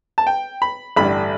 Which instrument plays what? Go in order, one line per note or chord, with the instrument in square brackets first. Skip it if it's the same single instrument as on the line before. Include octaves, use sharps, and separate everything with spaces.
[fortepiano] A5
G5
B5
A1 G2 D3 G3 B5